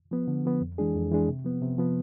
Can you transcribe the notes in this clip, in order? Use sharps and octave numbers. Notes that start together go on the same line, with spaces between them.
F3 B3
D3
F3 B3
F2
E3 G#3 D4 G#4
F2
E3 G#3 D4 G#4
C3
F3 B3
C3
F3 B3